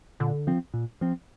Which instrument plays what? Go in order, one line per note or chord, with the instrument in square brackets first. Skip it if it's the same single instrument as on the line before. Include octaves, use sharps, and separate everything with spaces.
[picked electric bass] A#2 [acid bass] D3
[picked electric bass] F3 C4
A#2
F3 C4